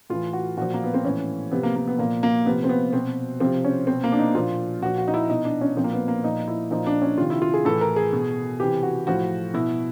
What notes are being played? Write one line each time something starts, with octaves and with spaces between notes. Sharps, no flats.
A2 E3 F4
F#4
A#2 F3 F#4
A#3
B3
C4
A2 E3 C#4
C3 F3 B3
A#3
A#3
B3
A#2 F3 A#3
A#3
C3 F3 B3
C4
B3
B2 C4
C3 F3 C4
C#4
B2 C4
A#3
D4
D#4
A#2 F3 F4
A#2 F3 F#4
F#4
D#4
E4
B2 D#4
D4
C#4
A#2 F3 C4
A#3
B3
A#3
A#2 F3 D#4
E4
A#2 F3 D#4
D4
C#4
C3 D#3 F4
E4
F4
G#4
A2 E3 A4
A#4
G#4
B2
C3 E3 G4
F#4
A2 F3 F#4
B2 E4